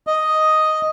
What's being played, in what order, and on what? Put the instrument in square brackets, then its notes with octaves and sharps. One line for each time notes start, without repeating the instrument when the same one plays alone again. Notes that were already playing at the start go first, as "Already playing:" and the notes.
[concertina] D#5